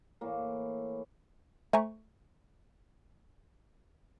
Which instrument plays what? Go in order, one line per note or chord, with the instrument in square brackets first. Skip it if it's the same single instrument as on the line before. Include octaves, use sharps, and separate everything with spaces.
[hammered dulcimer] A2 E3 A#3
[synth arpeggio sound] A3 C5 G#5 A#5 C#6